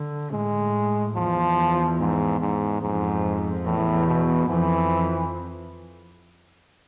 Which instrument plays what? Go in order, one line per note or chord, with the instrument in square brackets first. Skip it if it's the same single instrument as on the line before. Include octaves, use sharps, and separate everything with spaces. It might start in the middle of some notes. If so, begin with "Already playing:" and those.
Already playing: [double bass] D3
[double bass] A2 [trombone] G#3
[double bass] E2 [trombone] F3
[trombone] G#2
G#2
[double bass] F2 [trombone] G#2
[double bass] E2 [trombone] A2
[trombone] B2
[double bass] F2 [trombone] E3